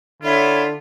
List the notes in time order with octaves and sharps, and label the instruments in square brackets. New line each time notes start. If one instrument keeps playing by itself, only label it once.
[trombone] D3 [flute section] E4 C#5 B5 [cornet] F4